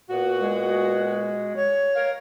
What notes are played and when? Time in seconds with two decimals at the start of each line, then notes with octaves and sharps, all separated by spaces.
0.10 A#2 B3 F#4
0.40 G#3
1.56 C#5
1.95 A#4 F5